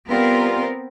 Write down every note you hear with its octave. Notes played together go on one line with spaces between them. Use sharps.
G3 B3 C4 F4 A#4